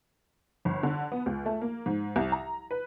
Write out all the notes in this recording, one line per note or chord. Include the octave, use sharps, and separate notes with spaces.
G1
D3
B3
C#2
A3
A#3
G#2
C2
A#5
B4